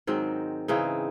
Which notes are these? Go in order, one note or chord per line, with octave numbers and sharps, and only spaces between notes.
G#2 D#3 F#3 C4
C#3 E3 C4 D#4